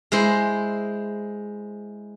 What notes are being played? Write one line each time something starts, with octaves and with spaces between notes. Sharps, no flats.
G#3 E4 C5